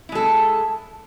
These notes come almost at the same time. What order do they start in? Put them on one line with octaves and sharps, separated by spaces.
E4 G#3 A4